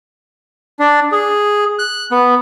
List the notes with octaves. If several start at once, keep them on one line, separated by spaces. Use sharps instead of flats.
D4
G#4
F#6
B3